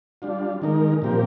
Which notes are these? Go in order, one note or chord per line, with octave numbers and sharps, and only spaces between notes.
G3 D4 F4
D#3 G#3 D#4 A#4
A#2 F3 C4 G4 A#4